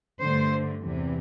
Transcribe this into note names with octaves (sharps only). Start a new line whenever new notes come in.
G2 D3 A3 C5
E2 C3 E3